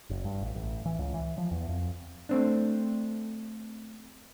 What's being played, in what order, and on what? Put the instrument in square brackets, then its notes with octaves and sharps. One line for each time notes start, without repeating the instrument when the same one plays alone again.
[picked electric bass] F#1
G2
A1
A1
E3
C#2
E3
F3
E2
F2
[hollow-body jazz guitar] A3 C4 D4